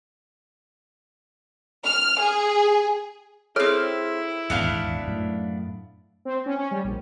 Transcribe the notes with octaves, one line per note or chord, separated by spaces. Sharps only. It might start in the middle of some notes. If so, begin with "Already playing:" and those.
F6
G#4
C4 E4 G#4 A4 C#5 F6
D#1 G#1 E2 B3 D4 F5
F#2 A2
C4
C#4
C#4
G3
A#1